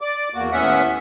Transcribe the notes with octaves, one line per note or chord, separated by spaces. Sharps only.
D5 D6
E2 A#3 F#4
D#2 A2 B3 C#4 E5 F#5